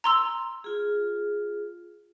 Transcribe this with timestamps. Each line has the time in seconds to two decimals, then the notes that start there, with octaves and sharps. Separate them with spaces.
0.04 A#5 C6 E6
0.64 F4 G#4